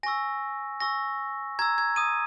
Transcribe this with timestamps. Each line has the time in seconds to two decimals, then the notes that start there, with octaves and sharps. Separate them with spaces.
0.03 G#5 C#6 E6 A#6
0.80 G#5 C#6 E6 A#6
1.59 A#5 E6 G#6
1.78 G#6
1.96 D#6 D#7